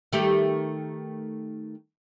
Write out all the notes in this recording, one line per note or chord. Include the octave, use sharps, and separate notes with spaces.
D#3 A3 G4